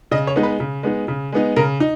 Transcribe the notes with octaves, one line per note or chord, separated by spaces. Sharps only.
C#3 D#5
C#5
G#3 B3 D#4
B4
C#3
G#3 B3 D#4
C#3
G#3 B3 D#4
C#3 A#4
D#4